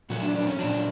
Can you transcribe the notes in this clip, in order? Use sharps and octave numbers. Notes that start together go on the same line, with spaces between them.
A#2 F#3 F#4
D4
D4
C#4
A#2 F#3 D4